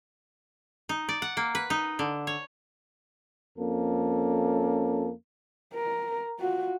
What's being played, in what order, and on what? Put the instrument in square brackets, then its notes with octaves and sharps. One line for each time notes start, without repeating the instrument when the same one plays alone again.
[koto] D#4
D5
F#5
A#3
B4
D#4
D3
C#5
[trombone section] F2 A#3 C#4 A4
[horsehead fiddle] A#4
F4 F#4